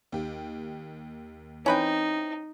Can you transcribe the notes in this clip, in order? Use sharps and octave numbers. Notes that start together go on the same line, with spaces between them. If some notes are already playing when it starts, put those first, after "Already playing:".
D#2 G4
E3 C4 C#4 D#4 B4 G5